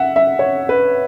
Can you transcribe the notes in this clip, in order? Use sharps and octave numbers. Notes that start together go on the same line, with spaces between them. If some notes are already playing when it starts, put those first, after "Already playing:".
Already playing: E5 F#5
E5
C#5
B4